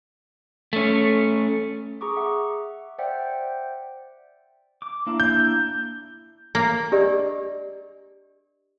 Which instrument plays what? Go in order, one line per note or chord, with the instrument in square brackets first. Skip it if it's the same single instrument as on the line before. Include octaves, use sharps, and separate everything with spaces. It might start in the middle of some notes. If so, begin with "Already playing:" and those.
[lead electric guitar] A3 C#4
[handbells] G#4 A#5 C#6 D6
E5 F#5
C5 D5 E5 F#5 G5
[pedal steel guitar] D6
A#3 D4 E4
[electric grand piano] G6
[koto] A#3
[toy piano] D4 G4 A#4 D5 D#5